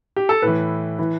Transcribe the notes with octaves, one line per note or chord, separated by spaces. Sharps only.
G4
A4
A2 E3 B4
E3